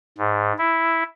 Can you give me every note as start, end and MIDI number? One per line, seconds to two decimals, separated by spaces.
0.18 0.53 44
0.59 1.04 64